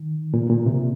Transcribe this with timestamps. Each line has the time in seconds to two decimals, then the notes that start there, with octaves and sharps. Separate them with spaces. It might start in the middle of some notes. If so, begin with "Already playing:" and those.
Already playing: D#3
0.34 A#2
0.50 A#2
0.66 C3